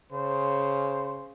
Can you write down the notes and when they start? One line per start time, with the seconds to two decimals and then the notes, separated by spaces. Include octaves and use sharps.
0.12 C#3 C5